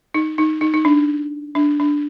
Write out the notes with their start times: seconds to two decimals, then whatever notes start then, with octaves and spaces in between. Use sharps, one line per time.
0.14 D#4
0.38 D#4
0.61 D#4
0.74 D#4
0.85 D4
1.55 D4
1.80 D4